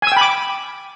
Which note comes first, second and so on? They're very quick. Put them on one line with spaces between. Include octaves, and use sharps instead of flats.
G#5 E6 G5 B5 D6